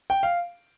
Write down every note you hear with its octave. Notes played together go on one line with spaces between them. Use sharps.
G5
F5